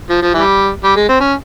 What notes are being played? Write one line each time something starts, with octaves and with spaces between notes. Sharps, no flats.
F3
F3
E3 G3
G3
G#3
C4
C#4